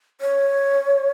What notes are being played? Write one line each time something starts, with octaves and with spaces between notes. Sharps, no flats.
C#5